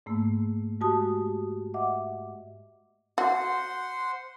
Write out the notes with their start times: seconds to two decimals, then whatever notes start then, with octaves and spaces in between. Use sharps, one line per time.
0.06 G#2 A3 A#3 E6
0.81 G#3 F#4 G4 A5 D#6
1.74 D#5 E5 F#5 D6
3.18 F#4 C5 F#5 C6